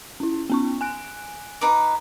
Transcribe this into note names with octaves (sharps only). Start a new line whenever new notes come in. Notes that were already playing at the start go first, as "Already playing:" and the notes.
C#4 E4
B3 C#4 C#6
G#5 F#6 D7
D#4 B4 D6